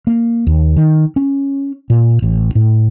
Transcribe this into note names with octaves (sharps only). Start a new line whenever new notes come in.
A#3
D#2
D#3
C#4
A#2
A1
A2